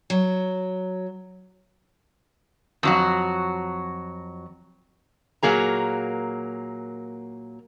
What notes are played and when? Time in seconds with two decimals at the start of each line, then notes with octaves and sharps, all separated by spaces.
0.10 F#3
2.83 F2 F#3 F#4
5.43 A#2 F#3 A#3 G#4 A#5